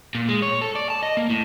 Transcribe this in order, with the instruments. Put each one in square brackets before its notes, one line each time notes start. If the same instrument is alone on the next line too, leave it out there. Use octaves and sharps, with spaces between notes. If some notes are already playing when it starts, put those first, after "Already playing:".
[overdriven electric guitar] A#2
G#3
C#5
A4
D5
A5
D#5
A#3
A2